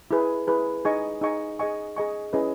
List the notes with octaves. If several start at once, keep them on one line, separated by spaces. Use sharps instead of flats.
E4 G#4 B4
E4 G#4 B4
D#4 G#4 D#5 G#5 C#6
D#4 G#4 D#5 G#5 C#6
G#4 D#5 G#5 C#6
G#4 D#5 G#5 C#6
C#4 E4 G#4 B4 D#5